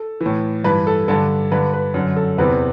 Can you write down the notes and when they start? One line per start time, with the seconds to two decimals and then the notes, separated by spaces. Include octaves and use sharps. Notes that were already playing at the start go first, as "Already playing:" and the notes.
Already playing: A4
0.21 E3
0.26 A2
0.64 G2 E3 B4
0.87 A4
1.08 G2 D3 A4
1.51 G2 D3 B4
1.73 B4
1.94 F#2 D3
2.16 A4
2.38 E2 C3 E3 B4